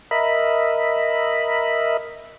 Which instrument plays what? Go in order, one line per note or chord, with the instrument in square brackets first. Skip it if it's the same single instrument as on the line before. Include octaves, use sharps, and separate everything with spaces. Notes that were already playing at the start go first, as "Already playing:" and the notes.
[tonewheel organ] A#4 D#5 E5 B5